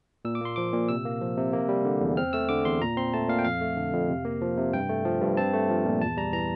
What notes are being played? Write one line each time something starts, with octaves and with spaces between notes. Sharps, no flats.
A#2 E6
D6
A#3 C6
F3 D6
A#2
C3 E6
A#3
F3
C3
A#3
G3
D3
E2
C4 F6
A3 E6
D3 D6
E2 C6
A#2 A#5
C4 C6
A3 A5
A#2 F5
G5
F2 F5
A3
D3
F2
C3
A#3
F3
C3
G2 G5
A3
F3
G2
C4 A5
A3
F3
A#2
E2 A5
G3 A#5
E3 A#5